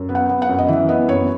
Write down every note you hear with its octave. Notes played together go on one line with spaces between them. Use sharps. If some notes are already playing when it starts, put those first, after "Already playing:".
Already playing: F#2
B3
F#5
B3
F#5
F#2
D#5
E3 E5
B3 D#5
F#2 C#5